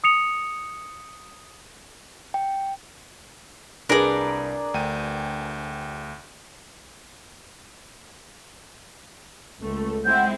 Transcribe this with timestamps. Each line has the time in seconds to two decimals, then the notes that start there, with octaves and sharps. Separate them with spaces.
0.04 D#6 C#7 F7
2.34 G5
3.89 C2 D4 G#4 A#4 B4 D5 B5 D7
4.74 D2 G5 D#7
9.61 C#2 A3
10.05 G#3 C4 E4 F#5 G6